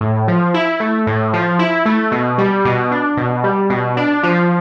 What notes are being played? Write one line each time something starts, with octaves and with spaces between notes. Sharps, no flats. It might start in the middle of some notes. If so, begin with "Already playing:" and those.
A2
F3
E4
A3
A2
F3
E4
A3
B2
G3
B2
D4
B2
G3
B2
D4
F3